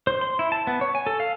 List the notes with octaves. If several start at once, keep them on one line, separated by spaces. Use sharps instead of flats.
C5
C6
E4
A5
B3
C#5
G#5
A4
F5